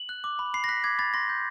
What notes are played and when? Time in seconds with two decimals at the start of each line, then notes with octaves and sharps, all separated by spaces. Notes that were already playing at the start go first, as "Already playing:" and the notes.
Already playing: F#7
0.09 F#6
0.24 D6
0.39 B5
0.54 B5 C7
0.64 A#6
0.69 F#6 B6
0.84 D6 G#6
0.99 B5 A6
1.14 C6 A#6
1.29 G6